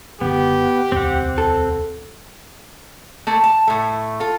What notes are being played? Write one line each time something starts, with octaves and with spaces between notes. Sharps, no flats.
F#1 B2 D3 B3 G4
E1 D2 C4 F#5
A4
A3 A#3 A4
A5
A2 A3
F4 A4